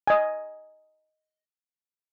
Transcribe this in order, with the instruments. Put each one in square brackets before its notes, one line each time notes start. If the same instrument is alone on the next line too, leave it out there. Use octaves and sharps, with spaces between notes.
[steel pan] D#5 G#5